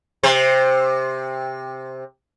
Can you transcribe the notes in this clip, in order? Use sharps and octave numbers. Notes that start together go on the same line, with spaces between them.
C3 C5